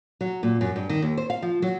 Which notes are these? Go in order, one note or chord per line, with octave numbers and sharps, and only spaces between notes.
F#3
A#2
F#2
G2
D#3
D#2
C5
F5
F3
F#3